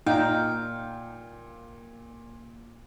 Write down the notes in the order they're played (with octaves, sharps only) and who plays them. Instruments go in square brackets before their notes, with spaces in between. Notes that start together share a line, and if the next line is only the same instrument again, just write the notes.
[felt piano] A#2 [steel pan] D#4 [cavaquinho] F5 [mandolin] G5